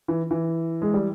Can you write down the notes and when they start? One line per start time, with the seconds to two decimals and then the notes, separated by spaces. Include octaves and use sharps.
0.08 E3
0.31 E3
0.82 G#3
0.94 G3